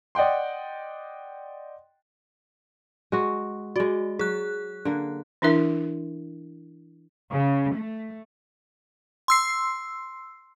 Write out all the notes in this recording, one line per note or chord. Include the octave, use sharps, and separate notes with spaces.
D5 D#5 F#5 G5 C6
G#3 F#4
G#3 F#4 D5
F#3 G#4 F#6
D3 A#3
E3 D4 E4 A#4 E5
C#3
A3
C6 E6 C7